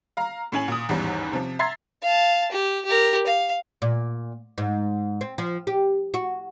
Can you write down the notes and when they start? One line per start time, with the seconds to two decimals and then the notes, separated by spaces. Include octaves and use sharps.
0.17 F5 A#5
0.52 A2 C#4 G#5 F#7
0.68 A#2 D#6
0.89 A1 E2 G#2 D#3 G3
1.33 C3 F3
1.59 E5 A#5 C6 G#6 A6 C7
2.03 F5 A5
2.52 G4
2.86 G4 A#4
3.27 F5
3.82 A#2
4.58 G#2
5.21 C4
5.38 F3
5.67 G4
6.14 F#4